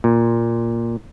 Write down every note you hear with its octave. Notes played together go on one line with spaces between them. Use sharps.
A#2